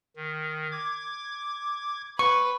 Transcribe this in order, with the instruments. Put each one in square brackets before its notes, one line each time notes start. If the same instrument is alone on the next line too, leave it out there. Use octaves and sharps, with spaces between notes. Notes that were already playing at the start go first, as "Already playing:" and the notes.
[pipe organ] D#3
D6 G#6
[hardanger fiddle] B4 [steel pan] C#6